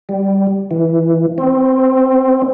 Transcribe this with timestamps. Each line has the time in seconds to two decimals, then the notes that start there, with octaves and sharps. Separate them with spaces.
0.09 G3
0.71 E3
1.38 C4